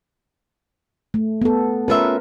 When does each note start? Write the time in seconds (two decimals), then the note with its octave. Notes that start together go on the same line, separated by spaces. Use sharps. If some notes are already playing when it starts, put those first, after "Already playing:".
1.14 A3
1.42 B3 A4
1.88 C#4 F4 A#4 B4 E5